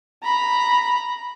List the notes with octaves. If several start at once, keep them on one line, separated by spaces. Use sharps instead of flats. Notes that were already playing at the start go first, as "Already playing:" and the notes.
A#5 B5